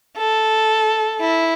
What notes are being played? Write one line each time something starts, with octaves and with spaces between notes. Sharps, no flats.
A4
E4